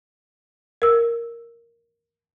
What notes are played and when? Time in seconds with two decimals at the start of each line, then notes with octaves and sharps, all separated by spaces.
0.82 A#4 E6